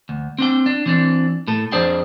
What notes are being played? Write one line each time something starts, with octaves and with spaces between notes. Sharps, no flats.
D2
C4 D4 G5
D4
E3 C4 D4
A2 A4
F2 D4 G#4 C5 D5 G5